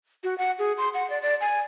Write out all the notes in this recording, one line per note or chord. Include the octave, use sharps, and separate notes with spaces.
F#4
F#5
G#4
C6
F#5
D5
D5
G#5